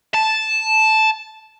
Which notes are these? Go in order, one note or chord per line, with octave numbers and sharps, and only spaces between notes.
A5